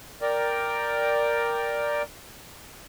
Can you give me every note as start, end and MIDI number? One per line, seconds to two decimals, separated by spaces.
0.22 2.02 70
0.22 2.02 74
0.22 2.02 79